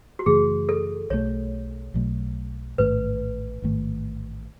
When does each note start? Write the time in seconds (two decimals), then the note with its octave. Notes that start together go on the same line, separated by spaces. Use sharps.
0.19 F#4
0.26 F#2 C#3 E3 A3 G#4
0.69 A4
1.10 B1 B2 F#3 A3 C#5
1.94 B1 B2 F#3 A3
2.78 A1 G#2 D#3 A3 B4
3.62 A1 G#2 D#3 A3